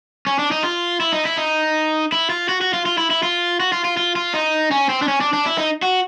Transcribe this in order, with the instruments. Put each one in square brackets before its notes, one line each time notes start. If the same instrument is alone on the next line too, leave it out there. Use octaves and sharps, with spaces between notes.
[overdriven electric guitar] C#4
D4
D#4
F4
E4
D#4
E4
D#4
E4
F4
F#4
F#4
F4
F4
E4
E4
F4
F#4
F4
F4
F4
F4
D#4
C#4
C4
D4
C#4
D4
D4
E4
D#4
F#4